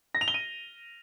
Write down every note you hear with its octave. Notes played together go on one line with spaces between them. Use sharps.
A#6
F7
G7
D#7